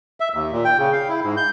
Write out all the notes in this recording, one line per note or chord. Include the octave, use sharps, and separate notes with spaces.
E5
D#2
A#2
G5
C#3
F5
E4
G#2
G6